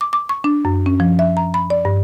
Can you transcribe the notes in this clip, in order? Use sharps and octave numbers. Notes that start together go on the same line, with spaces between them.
D6
D6
C#6
D4
F#2
C#4
F3
E5
A#5
B5
D5
G2